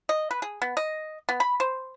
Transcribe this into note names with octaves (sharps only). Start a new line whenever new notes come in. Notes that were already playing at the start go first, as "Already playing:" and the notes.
D#5
B4
G#4
B3
D#5
B3
B5
C5